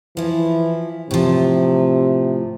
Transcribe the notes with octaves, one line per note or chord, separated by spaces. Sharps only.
E3 F3 E4
A2 C3 F3